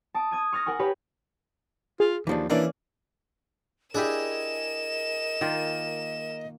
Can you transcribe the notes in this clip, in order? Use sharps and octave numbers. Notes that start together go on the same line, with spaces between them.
A5 D#6 D7
D#6 G#6 D#7
C#6 F6 A6 A#6
A#4 F#5 G#5 C#6
G4 B4 C#5
F4 G#4
D#2 E3 F3 D4
E3 A#3 C#4 D4 D5
D4 E4 G4 G#4 A#4 D#5 E7
D#3 A#3 F4